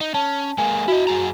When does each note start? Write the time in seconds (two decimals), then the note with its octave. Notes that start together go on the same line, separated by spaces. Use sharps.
0.01 D#4
0.14 C#4 A5
0.58 G#3 A#3 G#5
0.88 E4 F#4 D#5
1.07 F#2 G#4 A#5